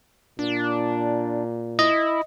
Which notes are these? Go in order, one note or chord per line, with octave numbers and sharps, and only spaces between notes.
A#2 D4
E4 D#5